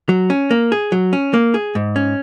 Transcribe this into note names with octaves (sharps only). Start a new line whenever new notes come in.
F#3
C#4
A#3
G#4
F#3
C#4
A#3
G#4
G#2
C#4